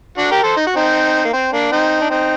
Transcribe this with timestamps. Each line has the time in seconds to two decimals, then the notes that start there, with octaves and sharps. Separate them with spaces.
0.18 D4 F#4
0.31 G4 A#4
0.43 A4 C5
0.56 D#4
0.67 F#4
0.76 C4 D#4
1.25 A#3
1.33 C4
1.53 A#3 D4
1.72 C4 D#4
2.01 D4
2.10 C4 D#4